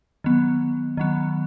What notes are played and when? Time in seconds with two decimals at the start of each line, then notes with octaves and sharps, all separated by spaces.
0.24 D#3 F#3 B3
0.97 D#3 F#3 B3